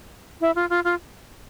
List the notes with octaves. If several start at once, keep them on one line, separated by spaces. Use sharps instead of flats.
E4
F4
F4
F4